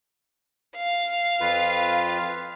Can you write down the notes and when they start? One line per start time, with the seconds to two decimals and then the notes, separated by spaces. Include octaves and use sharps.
0.76 F5
1.41 F2 F4 B4